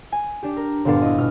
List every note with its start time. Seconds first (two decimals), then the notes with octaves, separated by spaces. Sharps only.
0.12 G#5
0.43 D4 G4
0.57 A#4
0.85 G1 A#2 B3 D4 F5 A6
1.02 E4 D#5
1.17 B2 F6